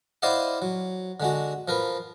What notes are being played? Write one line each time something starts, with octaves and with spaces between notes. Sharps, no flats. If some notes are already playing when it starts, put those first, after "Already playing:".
E4 C5 D5 D#5 F5 F#5
F#3
D3 G#3 F#4
F3 A#4 B4